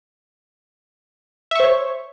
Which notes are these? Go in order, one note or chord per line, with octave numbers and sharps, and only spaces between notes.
C5 C#5 E5 C#6